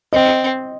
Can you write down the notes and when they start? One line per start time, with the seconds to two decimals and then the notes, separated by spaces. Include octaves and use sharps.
0.13 C4 D#5